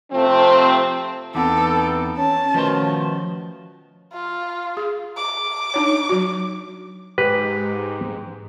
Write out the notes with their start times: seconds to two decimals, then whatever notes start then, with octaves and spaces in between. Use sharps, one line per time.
0.12 C3 F3 A3 C4
1.35 E2 B3 C4 D#4 A4 D6
2.17 C#4 A5
2.54 B2 D#3 F3 A3 C5
4.13 F4
4.77 G#4
5.17 D6
5.74 D4 D#4 C#5
6.09 F#3 F#4
7.18 G#2 G4 B4